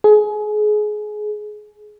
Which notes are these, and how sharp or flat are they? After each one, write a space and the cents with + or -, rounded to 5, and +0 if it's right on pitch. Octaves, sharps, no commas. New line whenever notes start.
G#4 +25